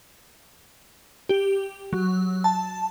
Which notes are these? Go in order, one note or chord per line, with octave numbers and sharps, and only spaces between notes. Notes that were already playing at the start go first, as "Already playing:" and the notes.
G4
F#3
A5